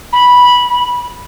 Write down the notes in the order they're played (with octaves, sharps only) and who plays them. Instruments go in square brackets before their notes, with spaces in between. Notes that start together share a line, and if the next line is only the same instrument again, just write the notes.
[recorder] B5